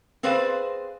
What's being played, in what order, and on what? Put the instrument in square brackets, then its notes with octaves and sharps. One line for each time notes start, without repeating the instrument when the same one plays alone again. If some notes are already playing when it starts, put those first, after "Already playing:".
[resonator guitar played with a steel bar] C4 G#4 B4 C5 D5 F5